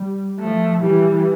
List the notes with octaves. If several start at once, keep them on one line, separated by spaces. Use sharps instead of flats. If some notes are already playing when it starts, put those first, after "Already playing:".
Already playing: G3
F3 A3
E3 G3